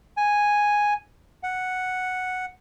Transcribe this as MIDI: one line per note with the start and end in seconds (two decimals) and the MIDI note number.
0.17 0.94 80
1.43 2.46 78